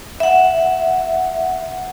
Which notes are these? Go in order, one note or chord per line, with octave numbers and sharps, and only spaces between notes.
E5 F#5